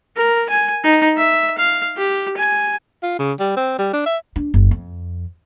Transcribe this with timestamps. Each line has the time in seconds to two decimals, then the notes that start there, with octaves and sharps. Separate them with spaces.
0.17 A#4
0.50 G#5
0.84 D#4
1.17 E5
1.58 F5
1.97 G4
2.37 G#5
3.03 F4
3.19 C#3
3.40 G3
3.57 C4
3.79 G3
3.94 D4
4.06 E5
4.36 D4
4.54 F#1
4.71 F2